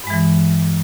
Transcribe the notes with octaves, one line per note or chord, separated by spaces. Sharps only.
G2 E3 G#3